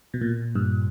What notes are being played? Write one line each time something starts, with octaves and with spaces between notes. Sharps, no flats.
B2
A#2
G2